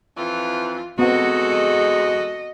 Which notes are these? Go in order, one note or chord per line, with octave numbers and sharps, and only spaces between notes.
F2 E3 F4
E2 G#3 B3 C4 F#4 A4 D#5
D#5